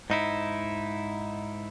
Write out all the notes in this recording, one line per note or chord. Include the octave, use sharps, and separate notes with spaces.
G#2 D#4 E4